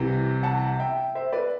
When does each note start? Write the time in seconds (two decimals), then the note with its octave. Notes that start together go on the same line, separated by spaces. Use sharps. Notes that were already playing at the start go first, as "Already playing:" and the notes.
Already playing: C2 C3 E3
0.43 F#5 A5
0.79 E5 G5
1.15 C5 E5
1.33 B4 D5